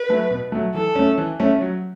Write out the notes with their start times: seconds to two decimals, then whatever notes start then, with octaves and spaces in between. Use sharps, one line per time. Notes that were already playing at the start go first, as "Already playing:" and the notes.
Already playing: B4
0.09 F#3 A3
0.31 B2
0.52 F#3 A3
0.74 E3 A4
0.95 A3 C#4
1.18 E3
1.40 A3 C#4
1.61 F#3